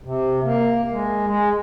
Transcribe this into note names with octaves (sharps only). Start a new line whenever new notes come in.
C3
A#3
G#3
G#3